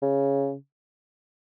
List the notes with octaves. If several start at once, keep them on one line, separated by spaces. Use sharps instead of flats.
C#3